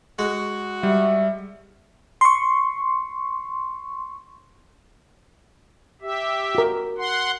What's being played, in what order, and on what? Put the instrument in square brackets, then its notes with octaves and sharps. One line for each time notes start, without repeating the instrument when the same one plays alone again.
[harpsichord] G#3 [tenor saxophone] F#4
[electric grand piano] G3 [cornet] E5
[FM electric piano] C6 C#6
[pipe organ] G4 E5
[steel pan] F#4 A#4
[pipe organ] F#5 C6